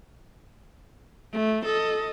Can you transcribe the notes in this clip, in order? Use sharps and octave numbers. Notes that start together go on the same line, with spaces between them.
A3
A4 D#5